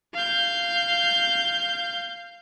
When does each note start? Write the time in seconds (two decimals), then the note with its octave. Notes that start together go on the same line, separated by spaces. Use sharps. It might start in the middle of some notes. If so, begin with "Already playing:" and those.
0.14 F5 G6